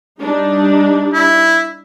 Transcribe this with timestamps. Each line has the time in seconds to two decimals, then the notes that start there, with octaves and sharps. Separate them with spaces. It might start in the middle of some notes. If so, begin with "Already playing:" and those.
0.21 G3 D4 D#4
1.14 E4